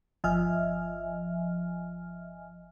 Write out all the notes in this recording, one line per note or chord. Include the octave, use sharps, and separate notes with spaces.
G1 F3 D#5 E5 G#5 F6